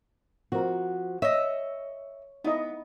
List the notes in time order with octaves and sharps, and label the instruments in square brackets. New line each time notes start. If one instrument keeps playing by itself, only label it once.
[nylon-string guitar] F3 F#4 [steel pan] C4 A#4
[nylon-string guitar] C#5 [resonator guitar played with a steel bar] D#5 E5
[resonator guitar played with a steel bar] B3 [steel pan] D#4 E4 D#5